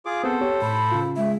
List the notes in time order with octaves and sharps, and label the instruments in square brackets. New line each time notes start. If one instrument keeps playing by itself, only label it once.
[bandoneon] F4 G#4 D6
[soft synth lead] B3 [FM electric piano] C4 G#4 F#5 [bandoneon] A4 C5
[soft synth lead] G4 [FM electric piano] C#5
[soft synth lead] A2 [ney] B5
[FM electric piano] C#3 F4
[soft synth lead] G#3 [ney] E5